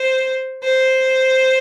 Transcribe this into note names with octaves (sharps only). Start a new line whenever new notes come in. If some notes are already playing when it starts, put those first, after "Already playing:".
Already playing: C5
C5